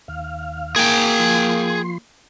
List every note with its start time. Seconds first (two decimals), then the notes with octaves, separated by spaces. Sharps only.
0.08 D#2 F5
0.76 A#3 G#4 G5
1.19 F3 C6